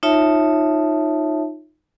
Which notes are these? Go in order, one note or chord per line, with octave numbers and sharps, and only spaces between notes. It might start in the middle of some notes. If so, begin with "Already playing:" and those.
D#4 F4 C#5 E5 A5